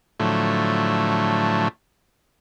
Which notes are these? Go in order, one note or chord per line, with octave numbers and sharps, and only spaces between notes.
A2 D3 F3 F#3 A3